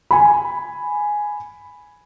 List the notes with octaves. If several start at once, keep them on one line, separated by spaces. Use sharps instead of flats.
G#5 B5